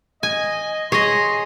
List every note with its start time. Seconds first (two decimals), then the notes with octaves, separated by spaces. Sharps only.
0.23 D#5 G#5
0.92 G#4 C#5 D#5 C6